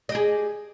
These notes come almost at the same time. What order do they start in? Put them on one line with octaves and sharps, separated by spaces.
D#5 G4 G#4